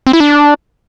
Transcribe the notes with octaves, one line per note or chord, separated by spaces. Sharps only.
C4
E4
D4